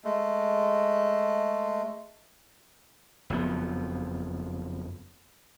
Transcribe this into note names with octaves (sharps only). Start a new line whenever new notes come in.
G#3 A3
F#1 F2 F3 B3